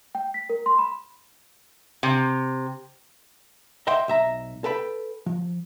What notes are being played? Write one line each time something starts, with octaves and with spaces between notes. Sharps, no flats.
G5
B6
A#4
C6
B5
C3
D#5 E5 F#5 G5 C6
B1 E5 A#5
A4 B4 G5 B5
F3